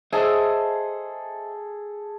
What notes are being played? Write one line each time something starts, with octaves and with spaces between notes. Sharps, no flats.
G#4 A4 C5 D#5 E5